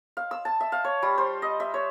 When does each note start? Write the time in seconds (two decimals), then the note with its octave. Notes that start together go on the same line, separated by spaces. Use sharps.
0.17 F5
0.31 E6
0.45 A5
0.60 E5
0.72 F5
0.84 C#5
1.02 G3
1.18 C5
1.42 D#5
1.60 E5
1.74 C#5